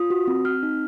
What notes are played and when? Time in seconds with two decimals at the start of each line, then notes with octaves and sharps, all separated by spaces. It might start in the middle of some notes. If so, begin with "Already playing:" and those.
Already playing: F4 D#6
0.10 F#4
0.27 C4
0.45 C4 F6
0.63 D#4